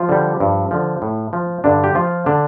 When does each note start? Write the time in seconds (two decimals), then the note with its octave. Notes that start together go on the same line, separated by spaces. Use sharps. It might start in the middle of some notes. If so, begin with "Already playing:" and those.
Already playing: F3 F4
0.09 D3 G3
0.40 G2
0.71 D3 F3
1.02 A2
1.33 F3
1.64 G2 D3 D4
1.84 G4
1.95 F3 F4
2.26 D3 D4